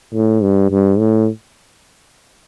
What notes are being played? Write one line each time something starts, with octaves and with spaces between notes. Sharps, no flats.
A2
G2
G2
A2